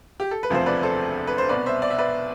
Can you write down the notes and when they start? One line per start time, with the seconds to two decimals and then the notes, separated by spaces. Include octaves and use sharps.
0.20 G4
0.31 A4
0.43 B4
0.50 E1 D2 C3 F3 C5
0.66 B4 D5
0.83 A4 C5
1.27 B4
1.38 C5
1.49 C2 B2 B4 D5
1.66 C5 E5
1.82 D5
1.90 E5
1.99 B4 D5